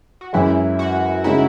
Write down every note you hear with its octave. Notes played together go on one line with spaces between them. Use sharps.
F#4
F#2 E3 G#3 E4
F#4
C#3 G#3 D#4 E4